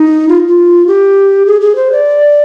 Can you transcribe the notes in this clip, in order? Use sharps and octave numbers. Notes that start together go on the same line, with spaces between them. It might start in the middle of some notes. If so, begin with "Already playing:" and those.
Already playing: D#4
F4
F4
G4
G#4
G#4
C5
D5